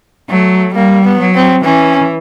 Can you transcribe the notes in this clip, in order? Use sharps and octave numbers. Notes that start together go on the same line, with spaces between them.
F#3 A3
G3 A#3
B3
F#3
C4
E3 C#4